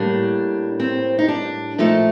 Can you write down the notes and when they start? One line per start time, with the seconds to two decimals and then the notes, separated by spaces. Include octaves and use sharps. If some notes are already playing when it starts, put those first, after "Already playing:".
Already playing: A2 G3 A#3 D4
0.80 C4
1.19 D#4
1.28 D4
1.78 A#2 F3 A3 D#4